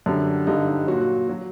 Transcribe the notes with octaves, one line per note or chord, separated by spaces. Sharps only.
F#2 D3 G3 D4
G2 D3 G3 D#4
D#4
A#2 F#3 F#4
F#3